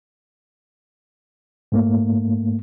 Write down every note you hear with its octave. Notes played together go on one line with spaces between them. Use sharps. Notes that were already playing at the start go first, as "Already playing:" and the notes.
G#2 A3 A#3